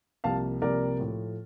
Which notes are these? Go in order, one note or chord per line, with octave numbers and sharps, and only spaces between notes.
C2 C3 F3 A#3 F5 A5
C2 C3 F3 A#3 A#4 D5
A2 F3 A3